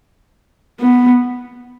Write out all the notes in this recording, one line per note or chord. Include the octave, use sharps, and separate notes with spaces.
B3